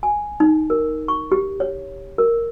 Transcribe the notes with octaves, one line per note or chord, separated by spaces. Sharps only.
G#5
D#4
A#4
C#6
G4
C#5
A#4